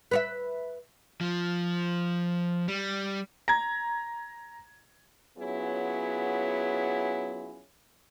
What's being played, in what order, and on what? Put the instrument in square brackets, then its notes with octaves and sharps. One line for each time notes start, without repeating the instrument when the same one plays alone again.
[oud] B4 C#5 E5
[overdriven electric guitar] F3
G3
[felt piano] A#5 G#6
[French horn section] F#3 B3 C#4 E4 F4 G#4